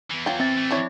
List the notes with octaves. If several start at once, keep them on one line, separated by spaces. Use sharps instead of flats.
E2 E3
F#3 F4 G5
C4 E5 A6
E3 A3
D4 E4 C#5